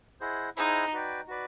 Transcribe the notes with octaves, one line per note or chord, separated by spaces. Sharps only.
E4 G#4 C5 D#5 F#5
D#4 E4 G#4 C5 D#5 F#5
F#4 B4 D5 G5
F#4 B4 D5